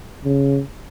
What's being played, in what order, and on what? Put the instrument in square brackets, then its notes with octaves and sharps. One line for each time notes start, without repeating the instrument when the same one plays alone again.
[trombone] C#3